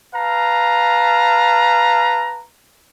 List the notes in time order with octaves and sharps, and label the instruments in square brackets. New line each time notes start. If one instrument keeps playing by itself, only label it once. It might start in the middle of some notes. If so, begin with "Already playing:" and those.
[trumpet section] B4 F5 A5 A#5